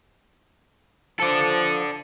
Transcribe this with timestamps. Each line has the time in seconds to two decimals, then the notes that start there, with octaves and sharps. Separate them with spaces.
1.20 F3 A4 D5